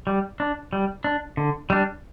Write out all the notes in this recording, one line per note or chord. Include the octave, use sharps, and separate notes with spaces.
G3
D4
G3
D4
D3
G3 D4